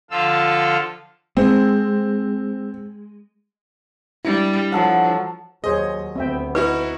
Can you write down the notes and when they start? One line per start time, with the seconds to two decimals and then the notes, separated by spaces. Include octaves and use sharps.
0.11 D3 F3 F4 A4 F5 E6
1.37 G#3 C4
4.25 G3 D4 E4
4.72 F3 F#3 A4 F#5
5.64 D#2 F#3 G#4 C5 C#5 D#5
6.16 D2 B3 C4 E5 G5
6.55 D#4 E4 F#4 B4